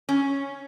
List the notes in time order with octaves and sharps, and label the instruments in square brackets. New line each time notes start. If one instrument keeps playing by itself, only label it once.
[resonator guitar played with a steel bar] C#4